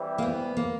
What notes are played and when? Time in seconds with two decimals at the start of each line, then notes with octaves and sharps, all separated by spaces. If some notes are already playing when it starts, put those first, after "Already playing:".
Already playing: E3 G3 C4 E4
0.18 A#3
0.22 B3
0.57 A#3